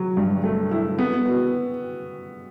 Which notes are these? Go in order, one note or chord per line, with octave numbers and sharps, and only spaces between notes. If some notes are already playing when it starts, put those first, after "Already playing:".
Already playing: F#3
G2
A3
E4
B3
F#4